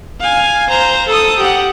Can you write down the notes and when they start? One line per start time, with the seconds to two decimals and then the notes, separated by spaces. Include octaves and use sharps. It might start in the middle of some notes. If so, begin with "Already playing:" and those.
0.21 F5 G#5
0.70 C5 A#5
1.09 A4 D#6
1.40 G4 F#5